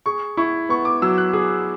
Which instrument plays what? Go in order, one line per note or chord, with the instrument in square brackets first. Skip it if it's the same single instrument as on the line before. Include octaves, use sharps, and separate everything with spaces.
[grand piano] G#4 [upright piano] C#6
[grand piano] E4 [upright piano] C#6
[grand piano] B3 [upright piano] C#6
[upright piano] D6
[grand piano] F#3 [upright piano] E6
[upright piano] F#6
[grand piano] G#4